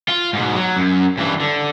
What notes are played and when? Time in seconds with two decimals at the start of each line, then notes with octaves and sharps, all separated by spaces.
0.08 F4
0.33 G#2 B2
0.55 F#3
0.77 F#2
1.18 G2 E3
1.40 D3